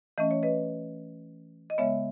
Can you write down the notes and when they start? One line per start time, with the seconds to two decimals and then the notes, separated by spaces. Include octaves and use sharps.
0.18 E3 A3 C#4 D#5
0.31 C#5
0.43 B4 D#5
1.70 D#5
1.78 C#3 G#3 B3 C#5 E5